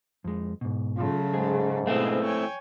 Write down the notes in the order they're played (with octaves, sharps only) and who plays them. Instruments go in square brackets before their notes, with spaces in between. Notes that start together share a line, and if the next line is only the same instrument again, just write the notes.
[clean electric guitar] F2 G#3
G#2 B2
[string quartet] C#3 F#3 A3 [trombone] F4
[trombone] G#2 [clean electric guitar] G#3 G#4
[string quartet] B2 G#4 [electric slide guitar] A3 C4 E4 [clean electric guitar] B4 F5
[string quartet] C#5 G5 G#5